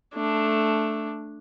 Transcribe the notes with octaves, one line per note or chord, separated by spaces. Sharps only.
A3 D4